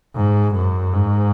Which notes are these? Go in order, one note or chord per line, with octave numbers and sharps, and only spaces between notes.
G#2
F#2
G#2